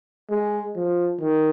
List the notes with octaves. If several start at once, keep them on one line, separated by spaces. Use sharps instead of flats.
G#3
F3
D#3